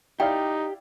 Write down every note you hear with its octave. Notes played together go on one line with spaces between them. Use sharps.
D#4 E4 G4 D5 F5 G5